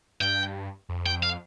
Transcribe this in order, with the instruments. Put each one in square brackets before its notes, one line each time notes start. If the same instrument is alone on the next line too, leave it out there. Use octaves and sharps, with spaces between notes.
[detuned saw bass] G2 [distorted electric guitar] G5
[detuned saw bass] F2
[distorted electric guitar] G5
F5